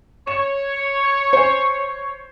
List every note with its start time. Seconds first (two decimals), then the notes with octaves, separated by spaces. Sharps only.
0.27 C#5 E7
1.33 C5 G#5